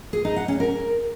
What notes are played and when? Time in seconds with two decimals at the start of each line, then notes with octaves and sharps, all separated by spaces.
0.13 G#4
0.25 D#4
0.36 F#5
0.48 C#4
0.60 A#4